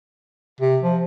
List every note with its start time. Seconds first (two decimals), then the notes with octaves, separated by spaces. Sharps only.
0.61 C3
0.82 F3